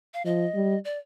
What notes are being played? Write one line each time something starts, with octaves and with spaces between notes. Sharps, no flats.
F5
F3 D#5
G3
D5